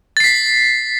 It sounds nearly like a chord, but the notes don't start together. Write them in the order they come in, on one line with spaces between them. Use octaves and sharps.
A6 C7 B6